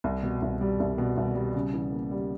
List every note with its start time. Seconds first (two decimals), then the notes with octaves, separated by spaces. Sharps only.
0.04 C2
0.23 B2
0.42 C2
0.61 G3
0.80 C2
0.98 B2
1.17 C2
1.35 G3
1.55 C#3
1.74 E3
1.92 A#3
2.11 G3